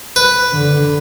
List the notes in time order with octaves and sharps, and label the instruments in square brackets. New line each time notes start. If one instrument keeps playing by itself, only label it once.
[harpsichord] B4
[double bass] D3